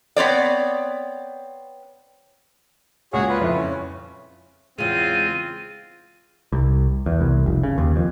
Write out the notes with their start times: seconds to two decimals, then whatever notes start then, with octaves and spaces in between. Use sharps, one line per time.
0.16 B3 C4 C#5 D5
3.13 C#2 A#2 F#4 G#4 C#5
3.29 F4 B4
3.41 F2 E4
3.57 C#4
4.78 E2 C#3 G#3 C4 F4 D#7
6.52 C2
7.06 E2
7.20 C2
7.46 F1
7.63 C#3
7.78 D#2
7.96 F2